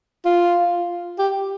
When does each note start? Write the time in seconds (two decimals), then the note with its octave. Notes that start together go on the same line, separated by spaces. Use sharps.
0.25 F4
1.19 G4